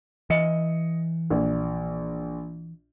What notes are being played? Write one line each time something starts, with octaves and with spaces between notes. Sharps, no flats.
E3 D#5 C#7
A#1